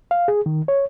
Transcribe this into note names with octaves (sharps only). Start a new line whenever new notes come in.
F5
G#4
D#3
C#5